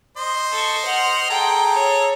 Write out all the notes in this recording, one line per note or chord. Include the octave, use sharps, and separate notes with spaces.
C5 D#5 C6
A4 C#6
F#5 F6
G#4 A4 G5 A#5
C#5